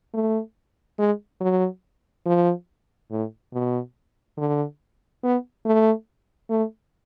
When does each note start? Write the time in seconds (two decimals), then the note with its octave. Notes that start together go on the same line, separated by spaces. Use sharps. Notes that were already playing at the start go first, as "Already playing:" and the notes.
0.13 A3
0.98 G#3
1.40 F#3
2.25 F3
3.11 A2
3.53 B2
4.37 D3
5.23 B3
5.65 A3
6.50 A3